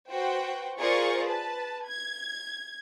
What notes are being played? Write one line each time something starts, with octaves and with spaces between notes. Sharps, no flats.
F#4 B4 C5 G5
F4 G#4 A#4 C5 D5 C#6
B4 A5
G#6